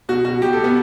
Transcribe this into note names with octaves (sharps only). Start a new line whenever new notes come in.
B2 F#4
B2 F#4
B2 G4
A4
B2
B3